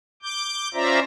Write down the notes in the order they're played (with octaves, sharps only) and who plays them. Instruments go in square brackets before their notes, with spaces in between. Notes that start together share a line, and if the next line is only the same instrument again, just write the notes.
[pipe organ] D6 G6
C#4 F4 C5 D5 E5 A#5